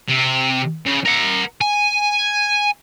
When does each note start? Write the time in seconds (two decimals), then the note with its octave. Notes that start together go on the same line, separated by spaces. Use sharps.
0.08 C3
0.86 C#3
1.06 A#4 F#5
1.61 G#5